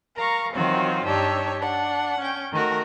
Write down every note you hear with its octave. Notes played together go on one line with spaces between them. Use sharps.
A#4 F5 A#5 C#6
D#3 E3 F#3 C4 F4 F#4
G2 D4 D#4 G4 C#5 E6
D4 F#5
C#4 G5
D#3 A3 F#4 A#4